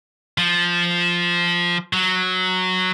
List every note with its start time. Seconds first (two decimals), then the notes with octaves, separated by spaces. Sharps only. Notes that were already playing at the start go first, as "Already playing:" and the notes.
0.38 F3
1.93 F#3